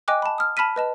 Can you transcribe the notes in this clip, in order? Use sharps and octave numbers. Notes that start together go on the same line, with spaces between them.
D#5 G5 G#5 D6 F#6
A5 B5
D#6 F6
A5 B5 F6 B6 D#7
B4 D#5 A5